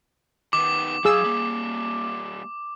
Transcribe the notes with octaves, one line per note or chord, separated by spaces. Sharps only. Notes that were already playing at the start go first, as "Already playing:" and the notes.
D#3 B3 D6
F#3 G#4 F5 E6
G3 A#3